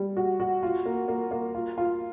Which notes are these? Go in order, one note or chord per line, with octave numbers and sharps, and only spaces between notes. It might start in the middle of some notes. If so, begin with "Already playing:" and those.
Already playing: G3
F#4
F#4
F4
A#3
A#3
A#3
F4
F4